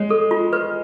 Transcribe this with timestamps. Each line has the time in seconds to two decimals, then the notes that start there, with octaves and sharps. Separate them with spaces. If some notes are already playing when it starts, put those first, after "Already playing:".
Already playing: G#3 C#5
0.10 A4
0.31 F4
0.53 B4